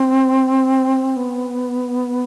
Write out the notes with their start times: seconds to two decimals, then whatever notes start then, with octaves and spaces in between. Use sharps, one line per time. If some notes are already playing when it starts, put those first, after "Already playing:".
Already playing: C4
1.17 B3